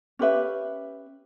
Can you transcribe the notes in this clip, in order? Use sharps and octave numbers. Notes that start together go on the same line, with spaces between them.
C#4 G4 B4 E5